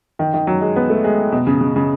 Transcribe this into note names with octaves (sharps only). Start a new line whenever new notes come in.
D#3
D#3
F#3
G#3
B3
A3
G#3
B2
C#3
C#3
C#3